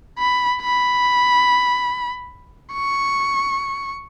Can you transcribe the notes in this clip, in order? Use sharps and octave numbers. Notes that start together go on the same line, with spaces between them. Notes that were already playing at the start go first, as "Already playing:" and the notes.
B5
B5
C#6